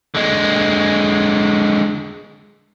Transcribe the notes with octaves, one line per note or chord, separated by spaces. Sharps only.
D3 G#3